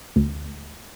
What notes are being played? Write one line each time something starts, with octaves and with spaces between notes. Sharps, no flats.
D2